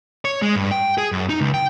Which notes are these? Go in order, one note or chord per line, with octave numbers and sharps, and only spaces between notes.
C#5
G#3
G2
G5
G#4
F#2
D#4
C#2
G5